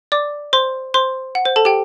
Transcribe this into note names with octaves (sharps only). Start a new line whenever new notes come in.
D5 D6
C5 C6
C5 C6
F#5
C5
A4 A5
G4 G5